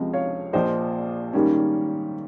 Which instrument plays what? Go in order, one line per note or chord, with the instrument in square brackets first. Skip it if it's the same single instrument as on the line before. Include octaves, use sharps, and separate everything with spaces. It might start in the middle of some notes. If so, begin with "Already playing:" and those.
Already playing: [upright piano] C#2 C3 F3 C4 D#5
C#5 F5
A#1 A#2 F3 C5 D#5
G#2 D#3 G3 A#3 C#4